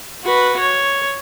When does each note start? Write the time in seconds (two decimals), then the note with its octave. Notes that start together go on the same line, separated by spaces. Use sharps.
0.25 F#4 B4
0.60 C#5